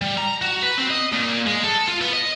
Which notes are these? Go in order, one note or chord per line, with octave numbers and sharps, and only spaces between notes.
G3
A#5
F#4
B4
C4
D#5
A#2
G#3
A4
F4
B3
D#5